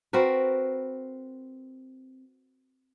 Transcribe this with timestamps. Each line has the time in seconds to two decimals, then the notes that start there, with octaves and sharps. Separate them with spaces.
0.13 C4 F#4 A#4 B4